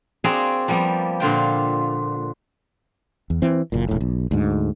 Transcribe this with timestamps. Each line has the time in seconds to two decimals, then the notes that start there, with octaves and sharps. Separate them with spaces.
0.24 C4 F#4 G#4 A#4 D5 F5
0.68 F3 G3 A#3 B3
1.20 A#2 D3 F4 G5
3.30 E2
3.42 E3 C4
3.72 F#1 A#2
3.89 E1 A2
4.01 B1
4.31 D2 G#2